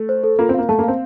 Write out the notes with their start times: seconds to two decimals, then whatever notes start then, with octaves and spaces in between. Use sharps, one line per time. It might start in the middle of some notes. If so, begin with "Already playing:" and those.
Already playing: A3
0.09 C5
0.24 A4
0.39 A#3 F4
0.49 C4
0.54 A#3 F5
0.69 A3 A5
0.79 A#3
0.83 C4 F5